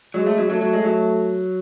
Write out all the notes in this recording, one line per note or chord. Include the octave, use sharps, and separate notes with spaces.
F#3 G#3
A3
F#3
F#3 A3
F#3
G#3
F#3